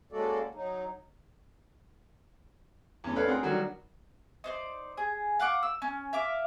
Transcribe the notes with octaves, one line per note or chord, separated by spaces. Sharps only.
G#3 A#3 C#4 F#4 A4 D5
F#3 D#4
E2 C#4
A4 B4 C#5 D5 F5
C4 G#4 A#4 F#5
D3 D#3 F#3 G3 A#3 F#4
D#4 C5 D5
G#4
F5 F#5 C#6 D6
E6
C#4
E5 F5 D6